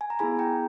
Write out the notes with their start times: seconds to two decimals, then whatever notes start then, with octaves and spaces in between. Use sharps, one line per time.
0.01 G#5
0.10 A#5
0.19 B3 E4 G#4 G#5 B5
0.39 G5 A#5